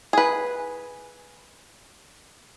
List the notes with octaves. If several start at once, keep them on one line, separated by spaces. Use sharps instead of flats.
G#4 B4